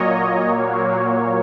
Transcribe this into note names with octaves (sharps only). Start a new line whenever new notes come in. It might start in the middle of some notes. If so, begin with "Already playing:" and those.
Already playing: A#2 F#3 A#3 C#5 D#5
A#2 F#3 A#3